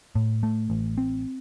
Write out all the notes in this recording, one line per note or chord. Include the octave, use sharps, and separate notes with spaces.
A2
A3
A1
C4